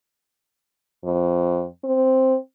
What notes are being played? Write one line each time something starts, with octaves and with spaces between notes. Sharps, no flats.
F2
C4